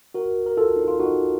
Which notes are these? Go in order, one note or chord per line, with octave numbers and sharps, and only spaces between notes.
F#4 A#4
A#4
F4 A4
D#4
F4
D#4 F#4